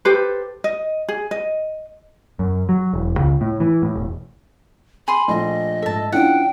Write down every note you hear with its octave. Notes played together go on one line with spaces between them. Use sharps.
G4 A4 B4 C5
D#5
G#4
D#5
F#2
F#3
E1
C#2
A2
E3
A2
E1
G#4 B5 C6
A#1 A3 D#5
G#2 A4 E5 A5
E3 C#4 D4 E4 F4 F#5 G5